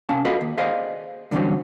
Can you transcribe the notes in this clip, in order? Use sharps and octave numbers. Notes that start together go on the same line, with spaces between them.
C3 C#4 F5 A5
F4 F#4 A4 B4 D#5 F5
D#2
G#4 B4 C5 D5 D#5 F5
G2 D3 E3 F#3 C4 C#4